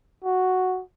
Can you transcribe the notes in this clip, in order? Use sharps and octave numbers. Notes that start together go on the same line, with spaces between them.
F#4